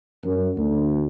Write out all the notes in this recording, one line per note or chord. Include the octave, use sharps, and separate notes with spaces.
F#2
D2